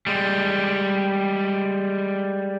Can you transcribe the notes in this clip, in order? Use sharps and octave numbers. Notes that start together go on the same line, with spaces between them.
G3 G#3